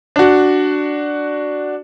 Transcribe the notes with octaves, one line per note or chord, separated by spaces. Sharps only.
D4 F#4